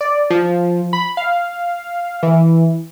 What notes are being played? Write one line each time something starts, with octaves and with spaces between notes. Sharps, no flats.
D5
F3
B5
F5
E3